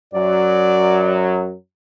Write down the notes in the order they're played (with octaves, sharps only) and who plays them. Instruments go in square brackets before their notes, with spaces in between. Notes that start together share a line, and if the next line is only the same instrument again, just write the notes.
[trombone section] F#2 F#3 [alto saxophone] D5